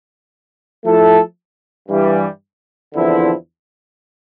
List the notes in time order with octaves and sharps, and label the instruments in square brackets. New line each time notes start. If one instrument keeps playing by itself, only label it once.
[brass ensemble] F3 A3 E4 A4
G2 E3 G3
E2 D3 F3 C4 E4